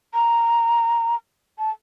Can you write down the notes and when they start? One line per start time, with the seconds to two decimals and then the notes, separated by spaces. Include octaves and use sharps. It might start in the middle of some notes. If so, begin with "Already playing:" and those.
0.14 A#5
1.59 A5